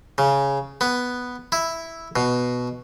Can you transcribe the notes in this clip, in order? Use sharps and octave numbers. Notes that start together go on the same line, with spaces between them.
C#3
B3
E4
B2